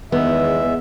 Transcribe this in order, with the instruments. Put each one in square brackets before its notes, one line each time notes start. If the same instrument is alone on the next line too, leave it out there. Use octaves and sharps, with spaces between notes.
[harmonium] E2 G#3 E5 [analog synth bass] D#3 [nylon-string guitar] B3